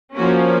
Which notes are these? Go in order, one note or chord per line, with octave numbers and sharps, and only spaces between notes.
F3 A#3 C#4 F#4